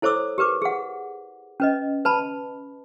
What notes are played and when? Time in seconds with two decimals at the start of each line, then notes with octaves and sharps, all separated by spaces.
0.02 E4 A4 C5 C#5 D6 E6
0.38 G4 A#4 B4 D6
0.62 G#4 F#5
1.60 C#4 B4 D#5
2.05 B4 A5 B5